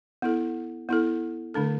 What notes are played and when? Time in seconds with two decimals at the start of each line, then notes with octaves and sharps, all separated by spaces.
0.22 B3 E4 A4
0.89 B3 E4 A4
1.54 D3 A3 D4 A4